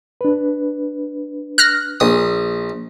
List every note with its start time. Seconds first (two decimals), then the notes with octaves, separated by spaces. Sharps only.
0.21 D4 B4
1.58 F6 F#6 A#6
2.00 A#1 D#6